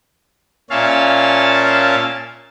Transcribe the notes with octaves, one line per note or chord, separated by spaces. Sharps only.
A#2 C#4 E5 F5 A5